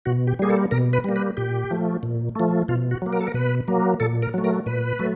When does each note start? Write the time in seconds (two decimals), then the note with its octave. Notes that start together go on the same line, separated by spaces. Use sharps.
0.06 B2 F#4
0.27 G4
0.39 G3 A#3 G#4
0.50 A4
0.71 B2 A#4
0.93 B4
1.04 G3 A#3
1.16 B4
1.37 A#2 G4
1.71 F3 A3
2.03 A#2
2.36 F3 A3
2.68 B2 F4
2.91 F#4
3.02 F#3 A#3
3.12 A#4
3.21 A4
3.27 A#4
3.34 B2 B4
3.68 F#3 A#3
4.00 A#2 A4
4.22 A#4
4.34 F#3 A3
4.44 A#4
4.66 A#2 B4
4.99 F#3 A3